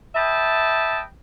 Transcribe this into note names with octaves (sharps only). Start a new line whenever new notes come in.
B4 D#5 E5 G5 A5